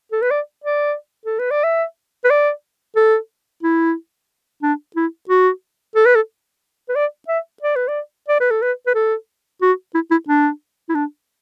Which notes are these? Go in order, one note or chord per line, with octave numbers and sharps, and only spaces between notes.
A4
B4
D5
D5
A4
B4
D5
E5
B4
D5
A4
E4
D4
E4
F#4
A4
B4
A4
B4
D5
E5
D5
B4
D5
D5
B4
A4
B4
B4
A4
F#4
E4
E4
D4
E4
D4